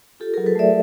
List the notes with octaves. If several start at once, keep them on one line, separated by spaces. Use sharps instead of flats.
F4 G4 A4
G#4 A#4
F#3
A4 B4
A3 D5 E5